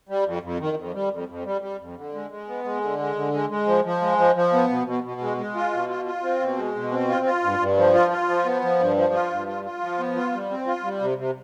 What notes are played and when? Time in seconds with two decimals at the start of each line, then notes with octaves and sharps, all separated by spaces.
0.09 G3
0.26 F2
0.43 F2
0.60 D#3
0.77 F2
0.94 G3
1.11 F2
1.29 F2
1.45 G3
1.61 G3
1.80 F2
1.96 D3
2.14 G#3
2.30 G#3
2.48 B3
2.64 G#3
2.81 D3
2.99 G#3
3.16 D3
3.33 G#3
3.50 G#3
3.67 F3
3.84 F3
4.01 G#3
4.18 F3
4.35 F3
4.53 B3
4.70 B2
4.86 B2
5.04 B2
5.21 G#3
5.37 G#3
5.55 F4
5.72 B2
5.89 F4
6.06 F4
6.22 C4
6.40 B2
6.57 G#3
6.75 B2
6.92 C4
7.08 F4
7.26 F4
7.43 G2
7.59 G2
7.77 F3
7.94 F4
8.11 F4
8.28 F3
8.45 B3
8.62 F3
8.79 G2
8.96 F3
9.13 F4
9.30 G2
9.48 F4
9.65 F4
9.81 F3
9.98 B3
10.16 F4
10.33 G3
10.50 C4
10.67 F4
10.83 G3
11.01 C3
11.18 C3